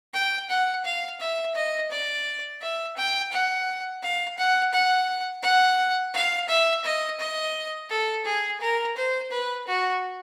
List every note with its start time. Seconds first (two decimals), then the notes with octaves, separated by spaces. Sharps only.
0.14 G5
0.50 F#5
0.84 F5
1.20 E5
1.55 D#5
1.91 D5
2.61 E5
2.97 G5
3.32 F#5
4.03 F5
4.38 F#5
4.73 F#5
5.43 F#5
6.14 F5
6.49 E5
6.84 D#5
7.19 D#5
7.89 A4
8.25 G#4
8.61 A#4
8.97 C5
9.31 B4
9.67 F#4